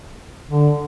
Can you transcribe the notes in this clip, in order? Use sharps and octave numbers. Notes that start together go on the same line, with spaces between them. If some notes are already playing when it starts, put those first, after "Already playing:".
D3